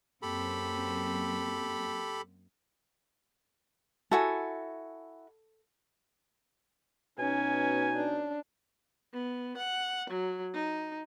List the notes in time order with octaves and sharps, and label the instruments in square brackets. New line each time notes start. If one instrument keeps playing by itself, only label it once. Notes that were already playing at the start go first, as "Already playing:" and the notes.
[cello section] F#2 A#3 C4 [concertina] G4 A4 B5
[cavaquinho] E4 F#4 G#5 [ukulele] A4
[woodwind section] B2 D#4 [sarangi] C#4 [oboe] G#5
[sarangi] D4
[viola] B3
F#5
F#3
D#4